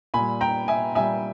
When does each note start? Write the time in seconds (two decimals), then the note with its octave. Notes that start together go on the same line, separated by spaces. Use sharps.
0.14 A#2 G3 G#5 B5
0.41 G5 A#5
0.68 E5 G#5
0.95 A#2 G3 E5 G#5